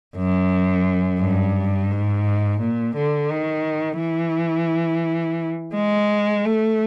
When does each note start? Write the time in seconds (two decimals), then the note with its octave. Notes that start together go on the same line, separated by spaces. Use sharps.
0.17 F#2
1.21 G2
1.91 G#2
2.61 A#2
2.96 D3
3.31 D#3
4.01 E3
5.75 G#3
6.45 A3